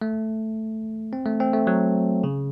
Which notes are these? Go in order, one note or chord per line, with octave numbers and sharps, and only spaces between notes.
A3
C4
A3
C4
A3
F#3
C#3